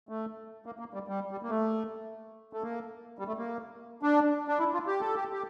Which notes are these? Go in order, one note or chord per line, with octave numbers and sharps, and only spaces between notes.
A3
A#3
A#3
G3
G3
G3
A#3
A3
A3
A#3
G3
A3
A#3
D4
D4
E4
F4
G4
A4
G4
G4